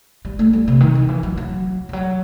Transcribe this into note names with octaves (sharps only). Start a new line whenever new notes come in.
G3
A3
G3
C3
D#3
E3
D#3
E3
F#3
F#3
E3
F#3